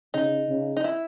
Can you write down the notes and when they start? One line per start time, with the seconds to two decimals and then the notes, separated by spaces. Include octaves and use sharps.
0.14 C#3 D#4
0.49 C#3
0.77 D#4
0.84 E4